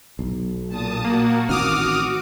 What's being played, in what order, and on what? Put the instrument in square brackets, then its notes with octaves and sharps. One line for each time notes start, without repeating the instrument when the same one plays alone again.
[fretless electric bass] B1
[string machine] A#2 A5 D#6
[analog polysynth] A#3 [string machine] F#4
[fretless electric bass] A1 D#3 C4 [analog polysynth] D6 D#6 F6